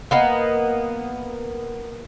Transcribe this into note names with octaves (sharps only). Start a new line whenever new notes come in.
A#3 B3 D#5